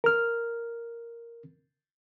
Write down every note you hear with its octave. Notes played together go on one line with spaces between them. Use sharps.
A#4 F6